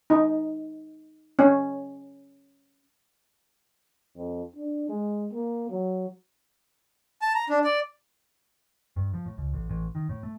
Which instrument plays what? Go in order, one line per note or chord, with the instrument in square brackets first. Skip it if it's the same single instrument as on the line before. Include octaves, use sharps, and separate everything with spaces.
[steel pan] D#4
C#4
[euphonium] F2
D4
G#3
A#3
F#3
[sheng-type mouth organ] A5
A#5
D4
D5
[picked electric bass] G2
F3
A2
C#2
A1
A1
D#3
A2
A3